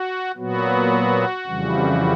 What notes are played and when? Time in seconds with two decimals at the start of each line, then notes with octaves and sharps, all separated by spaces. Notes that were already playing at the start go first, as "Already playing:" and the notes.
Already playing: F#4
0.37 A#2 F#3 B3 F#4
1.47 F2 C#3 E3 G3